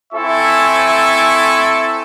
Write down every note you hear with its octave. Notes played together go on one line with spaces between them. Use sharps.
C4 E4 A4 E5 G#5 C#6